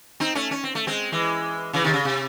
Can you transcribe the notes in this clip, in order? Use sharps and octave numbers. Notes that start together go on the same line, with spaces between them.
C4 D#4
A3 C#4
C#4
C4
A3
G#3 C4
E3 G#3
C#3 E3
C3 D#3
C#3
C3